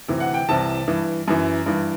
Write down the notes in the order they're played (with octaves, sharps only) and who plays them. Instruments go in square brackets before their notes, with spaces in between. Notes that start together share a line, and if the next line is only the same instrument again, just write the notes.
[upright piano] D2 C3 E3
F#5
G5
C2 C3 E3 A5
G2 E3
F#2 E3
G2 E3